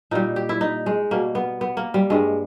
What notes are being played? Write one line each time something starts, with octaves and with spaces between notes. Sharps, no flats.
A#2 G3 D#4
G4
E4
D#4
G#3
B2 G3 A#3
B3
B3
A#3
G3
G2 G3 G#3